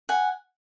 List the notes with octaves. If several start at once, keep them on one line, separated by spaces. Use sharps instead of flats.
F#5 G#5